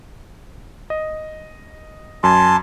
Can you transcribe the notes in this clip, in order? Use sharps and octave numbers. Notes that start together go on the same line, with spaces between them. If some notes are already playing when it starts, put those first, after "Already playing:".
D#5
F#2 G#5 A5 C6